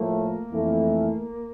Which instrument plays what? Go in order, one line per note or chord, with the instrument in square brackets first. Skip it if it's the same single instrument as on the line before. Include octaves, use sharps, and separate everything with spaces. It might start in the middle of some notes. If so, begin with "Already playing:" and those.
Already playing: [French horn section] A2 F3 A3 [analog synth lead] A#3
[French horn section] F2 E3 A3 E4